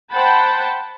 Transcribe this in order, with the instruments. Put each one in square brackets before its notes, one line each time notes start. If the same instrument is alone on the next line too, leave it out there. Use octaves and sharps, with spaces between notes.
[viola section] C5 F#5 G5 A5 B5